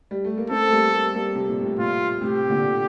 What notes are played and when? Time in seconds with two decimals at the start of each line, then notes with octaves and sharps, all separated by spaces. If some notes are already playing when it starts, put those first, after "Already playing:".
0.11 G3
0.25 A3
0.38 A#3
0.50 A3 C4 A4
0.67 A3
0.71 G3 A#3
0.92 G3 A#3
1.14 G3 A#3
1.35 C3
1.49 A#2
1.61 A2 C3
1.79 A#2 F4
2.21 A2 C3 G4
2.50 A#2 D3